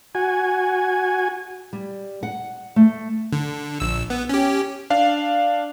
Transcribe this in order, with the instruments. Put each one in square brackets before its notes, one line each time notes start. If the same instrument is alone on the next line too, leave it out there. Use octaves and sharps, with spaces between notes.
[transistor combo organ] F#4 G#5
[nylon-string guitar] G3
F#5
A3
[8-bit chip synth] D3
A#1 E6
B3
C#4 G4
[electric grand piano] D4 F5